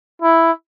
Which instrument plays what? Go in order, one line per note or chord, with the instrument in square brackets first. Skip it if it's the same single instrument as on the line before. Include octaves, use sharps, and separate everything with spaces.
[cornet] E4